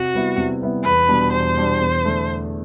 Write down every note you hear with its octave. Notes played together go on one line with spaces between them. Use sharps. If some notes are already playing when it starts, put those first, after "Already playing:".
Already playing: C3 F#4
G3 B3 E4
C3
G3 B3 E4
E2 B4
B2 G3 D4
E2 C5
B2 G3 D4
E2
D3 A3 D4